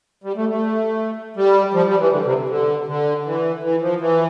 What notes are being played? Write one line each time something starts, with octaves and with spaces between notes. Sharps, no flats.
G3
A3
A3
G3
F3
G3
E3
D3
C3
D3
D3
E3
E3
F3
E3